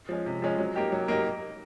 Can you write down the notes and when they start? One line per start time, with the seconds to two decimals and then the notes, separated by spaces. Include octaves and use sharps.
0.09 F3 G#3 C#4
0.26 C3
0.42 F3 G#3 C#4
0.58 F#3
0.76 A#3 D#4 G4
0.92 F#3
1.08 A#3 D#4 G4